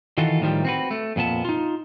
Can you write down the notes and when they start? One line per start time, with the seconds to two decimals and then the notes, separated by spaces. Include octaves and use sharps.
0.18 D#3 E3 F4 F#4 A4
0.41 A2 D#3 F3 G3
0.65 C4 F#4 B4
0.91 A3
1.16 F2 A#2 B3 A5
1.45 D#4 F4